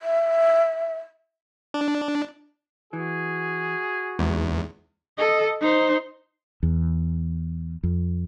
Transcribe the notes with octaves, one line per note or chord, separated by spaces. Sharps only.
E5
D4
E3 F#4 G#4
E2 G#2
A4 D#5
D#4 C5
E2
F2